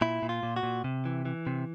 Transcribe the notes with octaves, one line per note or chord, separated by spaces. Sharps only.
A#2 E4
A#2
F4
A#2
F#4
A#2
C3
E3
E3
C3